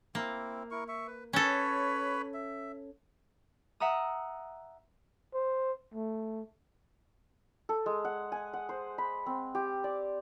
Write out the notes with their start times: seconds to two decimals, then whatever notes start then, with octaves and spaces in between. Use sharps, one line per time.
0.15 A#3 C4 E4
0.71 E4 A#4 C#6
0.88 E5 C#6
1.07 B4
1.33 C#4 A4 B4 C#5 B5
2.34 E5
3.80 E5 F#5 A#5 D#6
5.34 C5
5.94 A3
7.69 A4
7.86 G#3
8.05 F#5
8.32 G#5
8.54 F#5
8.69 C5
8.98 B5
9.26 C4
9.55 G4
9.84 D5